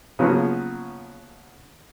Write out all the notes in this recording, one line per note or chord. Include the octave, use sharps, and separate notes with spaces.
C#3 F3 F#3 A#3 B3